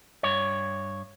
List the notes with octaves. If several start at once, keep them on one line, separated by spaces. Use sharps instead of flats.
G2 C#5